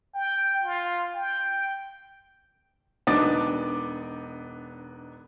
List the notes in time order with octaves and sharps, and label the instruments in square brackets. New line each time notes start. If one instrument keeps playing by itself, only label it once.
[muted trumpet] G5
F4
G5
[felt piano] E1 B3 D4 D#4 D6 A6